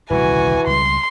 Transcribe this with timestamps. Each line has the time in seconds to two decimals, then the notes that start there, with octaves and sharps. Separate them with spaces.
0.10 D#1 C2 C#3 E3 F#4 G#5
0.67 C#2 G3 C6